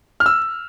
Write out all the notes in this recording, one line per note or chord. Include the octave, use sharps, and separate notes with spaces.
F6
E6